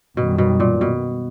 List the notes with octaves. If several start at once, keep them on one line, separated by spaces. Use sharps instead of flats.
F#2 B2 D#3 G3
B2
A#2
B2